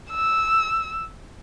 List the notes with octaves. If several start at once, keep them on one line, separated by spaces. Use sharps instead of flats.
E6